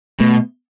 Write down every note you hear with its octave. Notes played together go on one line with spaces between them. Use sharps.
B2 A3